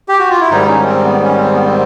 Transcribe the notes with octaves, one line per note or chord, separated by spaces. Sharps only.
G4
F#4
F4
E4
G#2 D#3 G3 D#4
C#4
C4
B3
C#4
C4
B3
C4